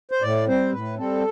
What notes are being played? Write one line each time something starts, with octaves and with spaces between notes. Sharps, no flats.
C5
A2 D5
G3 C4 C5
A2 B4
G3 C4 A4